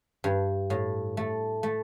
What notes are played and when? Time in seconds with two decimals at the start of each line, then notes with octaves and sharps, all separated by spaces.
0.24 G2
0.70 A2
1.17 A3
1.63 A3